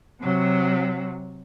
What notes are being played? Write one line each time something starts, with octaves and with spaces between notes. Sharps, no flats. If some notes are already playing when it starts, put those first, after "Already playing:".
C3 F#3